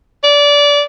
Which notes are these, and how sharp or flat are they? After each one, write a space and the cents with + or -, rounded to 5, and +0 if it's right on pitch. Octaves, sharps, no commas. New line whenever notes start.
D5 -25